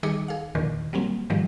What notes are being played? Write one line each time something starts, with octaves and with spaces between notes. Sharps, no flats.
D#3 G3 D#4 G#4 D6 C#7
G#4 F5
E2 A#2 D3 D#3
F#3 G3 A#3 C4
G#2 D#3 F3 G3